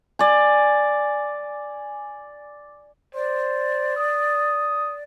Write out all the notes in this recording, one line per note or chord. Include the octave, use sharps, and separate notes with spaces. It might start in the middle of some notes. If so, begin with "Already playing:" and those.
D5 G#5
C5 D5
D#6